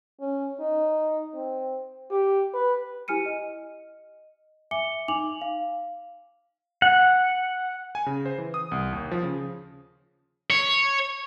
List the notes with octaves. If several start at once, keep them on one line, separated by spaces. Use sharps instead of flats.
C#4
D#4
C4
G4
B4
E4 G4 G#5 F6 C#7 D#7
D#5
E5 G#5 D6 C#7 G7
D#4 G#5 D6 F7 F#7
F5
F#5
G#5
C#3
C5
E3
D#6
C2
D#2
F3
C#3
C#5